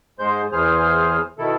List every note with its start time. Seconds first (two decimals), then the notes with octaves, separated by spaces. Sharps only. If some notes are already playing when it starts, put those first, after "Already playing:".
0.19 G#2 G#3 C5 G6
0.52 E2 E3 G#4 C5 F6
1.38 B2 D#3 E4 A4